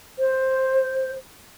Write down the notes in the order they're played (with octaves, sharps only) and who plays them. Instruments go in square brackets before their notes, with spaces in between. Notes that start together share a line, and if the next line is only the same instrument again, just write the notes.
[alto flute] C5